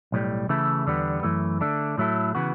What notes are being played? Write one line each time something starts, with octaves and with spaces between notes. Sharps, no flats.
B1 A2 G3
C#3 E3 A3 E4 A4
E2 D3 G3 B3
F#2 E3 A3
D3 A3 D4
A2 F#3 A3 E4 A4
C#3 E3 B3 F#4